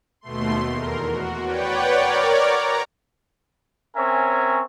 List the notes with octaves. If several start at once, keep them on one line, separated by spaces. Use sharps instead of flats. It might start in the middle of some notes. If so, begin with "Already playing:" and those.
D#2 B2 A3 C6
E2 A#4
F#4
B4 C#5 D5 F#5 G5
A#4 C#5 D5 D6
A#5
C4 C#4 A#4 C#5 E5 G#5